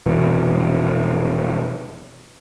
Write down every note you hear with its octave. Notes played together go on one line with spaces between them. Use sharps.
F1 B2 E3